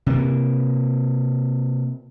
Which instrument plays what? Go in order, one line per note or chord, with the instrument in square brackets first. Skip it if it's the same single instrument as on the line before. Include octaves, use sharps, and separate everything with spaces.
[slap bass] C3 A#3